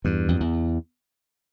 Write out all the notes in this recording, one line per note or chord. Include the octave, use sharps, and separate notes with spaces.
E2 G2
F2
E2